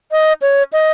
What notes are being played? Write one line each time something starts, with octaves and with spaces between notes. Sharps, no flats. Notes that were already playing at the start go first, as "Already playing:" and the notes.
D#5
C#5
D#5